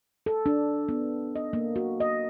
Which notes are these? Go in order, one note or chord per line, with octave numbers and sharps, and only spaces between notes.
A4
D4
B3
D#5
A#3
F#4
D#5